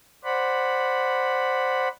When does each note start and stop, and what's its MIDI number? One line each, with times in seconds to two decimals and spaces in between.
0.24 1.88 72
0.24 1.88 74
0.24 1.88 78
0.24 1.88 83